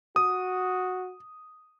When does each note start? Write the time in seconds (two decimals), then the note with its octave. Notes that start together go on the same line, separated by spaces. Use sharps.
0.16 F#4 D#6